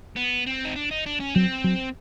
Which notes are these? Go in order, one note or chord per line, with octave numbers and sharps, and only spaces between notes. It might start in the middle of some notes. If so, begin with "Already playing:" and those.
B3
C4
D#4
D4
D#4
D4
C#4
F#3 C4
F#3